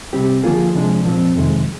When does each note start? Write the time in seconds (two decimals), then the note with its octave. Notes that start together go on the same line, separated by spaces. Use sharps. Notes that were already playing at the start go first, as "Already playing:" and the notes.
0.13 C3 G3 C4 G4
0.44 D3 F3 A#3 F4 G#4
0.75 C3 F3 G#3 D4
1.05 A#2 F3 C4
1.36 F2 C3 D#3 G#3